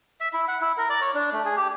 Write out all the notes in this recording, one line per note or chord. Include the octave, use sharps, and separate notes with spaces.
E5
E4
F#5
E4
A#4
D5
C#5
D4
A3
G#4
G4